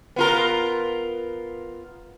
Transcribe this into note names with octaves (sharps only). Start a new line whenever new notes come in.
B3 F4 A#4